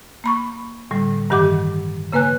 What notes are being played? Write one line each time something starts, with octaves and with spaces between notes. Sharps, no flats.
A#3 B5 C#6
A2 D3 G3
G2 D#3 E3 G4 F#5 D6
C#3 A#3 B4 G#5 F#6